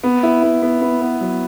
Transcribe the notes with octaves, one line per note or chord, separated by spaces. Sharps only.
B3
E4
B3
B3
B3
B3
F#3